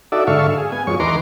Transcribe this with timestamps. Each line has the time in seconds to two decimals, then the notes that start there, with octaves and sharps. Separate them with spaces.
0.12 D#4 F#4 A4 D5 E5
0.27 G#2 D3 A4 E5 F5 C#6
0.57 G#4
0.72 B3 G#5
0.87 F#2 F3 G#3 C#5 C#6
1.00 E2 D#3 B4 A#5 C6 D6